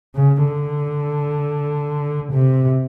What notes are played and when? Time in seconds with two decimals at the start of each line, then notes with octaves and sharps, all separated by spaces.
0.15 C#3
0.46 D3
2.32 C3